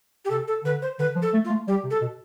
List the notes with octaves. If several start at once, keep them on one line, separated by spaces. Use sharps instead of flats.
G4
C3 A4
A4
D3 B4
C5
D3 B4
F3
A4
A3
F4
A3
G3 G4
C3
A4
B2